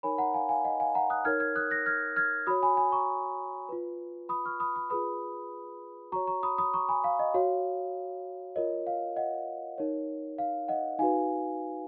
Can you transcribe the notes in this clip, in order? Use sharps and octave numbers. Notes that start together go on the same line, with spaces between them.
D#4 A#4 C#5 G#5 B5
F#5 A#5
F5 G#5
F5 G#5
D#5 F#5
F5 G#5
F#5 A#5
D#6 F#6
D#4 A#4 C#5 F6 G#6
F6 G#6
D#6 F#6
F#6 A#6
F6 G#6
F6 G#6
F#4 C#5 B5 D#6
G#5 B5
G#5 B5
A#5 C#6
F4 B4
B5 D#6
C#6 F6
B5 D#6
B5 D#6
F4 G#4 B4 B5 D#6
F#4 C#5 A#5 C#6
A#5 C#6
B5 D#6
B5 D#6
A#5 C#6
G#5 B5
F5
D#5
F#4 C#5 F5
F4 A#4 C#5 D#5
F5
D#5 F#5
D#4 A#4 C#5
F5
D#5 F#5
D#4 F#4 B4 F5 G#5